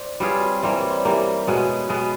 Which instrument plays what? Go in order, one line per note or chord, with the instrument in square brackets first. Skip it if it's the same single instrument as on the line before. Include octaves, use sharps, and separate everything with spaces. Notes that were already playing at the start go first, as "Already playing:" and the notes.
Already playing: [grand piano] C5 D5
[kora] G3 C4 F4 G#4 [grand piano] B4 C#5
[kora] E3 G3 A#3 [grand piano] C5 D5
[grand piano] B4 C#5
C5 D5
[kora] E3 G3 A#3 [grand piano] A#4 C5
[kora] B2 G#3 B3 [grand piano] B4 C#5
[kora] B2 G#3 B3